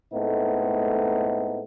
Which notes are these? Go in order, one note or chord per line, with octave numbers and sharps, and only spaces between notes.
A2 G#3 A3 B3 C4 D#4